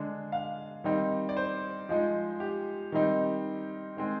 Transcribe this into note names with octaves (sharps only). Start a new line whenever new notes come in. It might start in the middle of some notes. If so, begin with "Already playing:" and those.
Already playing: D3 G#3 D4
F5
D#3 G3 C4 D#4
D5
C5
F3 G#3 D#4
G4
D#3 G3 C4 D#4
D#3 G#3 C4